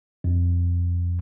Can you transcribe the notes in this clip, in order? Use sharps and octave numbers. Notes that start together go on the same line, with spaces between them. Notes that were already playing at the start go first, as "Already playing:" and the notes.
F2